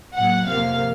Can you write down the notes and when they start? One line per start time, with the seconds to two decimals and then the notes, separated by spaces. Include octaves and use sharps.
0.15 A2 F#3 A#3 F#5
0.48 F2 C3 F3 A#3 F5